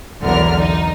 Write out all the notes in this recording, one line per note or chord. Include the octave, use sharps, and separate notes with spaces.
B1 E2 D3 A#4 F6
D#4